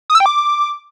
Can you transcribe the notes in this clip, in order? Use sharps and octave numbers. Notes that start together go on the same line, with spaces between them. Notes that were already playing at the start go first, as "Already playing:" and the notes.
D#6
E6
G5
D6